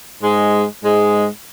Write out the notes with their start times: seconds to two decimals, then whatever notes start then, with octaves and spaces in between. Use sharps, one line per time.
0.22 G#2 G#3
0.82 G#2 G#3